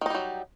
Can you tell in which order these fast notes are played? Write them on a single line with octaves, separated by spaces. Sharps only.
D#3 D#4 G3 F#3